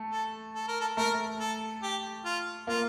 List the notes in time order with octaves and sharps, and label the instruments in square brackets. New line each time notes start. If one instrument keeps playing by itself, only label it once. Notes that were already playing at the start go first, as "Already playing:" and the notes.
Already playing: [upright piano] A3
[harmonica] A4
A4
A#4
A4
[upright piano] A3 [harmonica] A#4
[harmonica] A4
G4
F4
[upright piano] A#3 [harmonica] F4